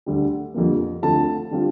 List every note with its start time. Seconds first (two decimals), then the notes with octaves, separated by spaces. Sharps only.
0.06 D2 D3 G3
0.54 F2 D3 G3 A#3
1.02 D2 D3 F3 A3 C4 A5
1.51 D3 G3 C4 F4